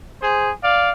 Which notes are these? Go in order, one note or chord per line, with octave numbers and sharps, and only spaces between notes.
G#4 C5
D5 F5